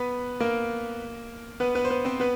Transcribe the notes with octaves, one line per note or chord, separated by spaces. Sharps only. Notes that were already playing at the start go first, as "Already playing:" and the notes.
Already playing: B3 B4
A#3 A#4
B3 B4
B3 B4
C5
B3 B4
C4 C5
B3 B4